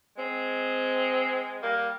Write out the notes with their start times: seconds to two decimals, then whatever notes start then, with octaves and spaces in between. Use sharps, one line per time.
0.17 G#3 C4
1.62 G3 A#3